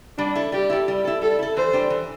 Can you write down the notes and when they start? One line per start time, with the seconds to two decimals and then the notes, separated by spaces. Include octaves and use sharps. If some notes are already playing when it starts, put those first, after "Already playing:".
0.18 G3 D4
0.35 E4 A4
0.52 G3 G4
0.70 E4 A4
0.88 G3
1.05 E4 A4
1.22 G3 A4
1.39 E4 A4
1.57 E3 C5
1.73 G3 D4 G4
1.90 E3